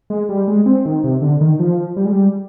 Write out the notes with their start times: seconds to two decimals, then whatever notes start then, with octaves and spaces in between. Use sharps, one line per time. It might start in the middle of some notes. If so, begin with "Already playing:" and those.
0.10 G#3
0.29 G3
0.48 G#3
0.66 C4
0.86 D#3
1.04 C3
1.22 D3
1.41 D#3
1.59 F3
1.97 G3
2.05 G#3
2.12 G3